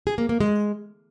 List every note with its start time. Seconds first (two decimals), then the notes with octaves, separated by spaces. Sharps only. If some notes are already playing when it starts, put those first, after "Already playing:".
0.07 G#4
0.18 A#3
0.29 A#3
0.40 G#3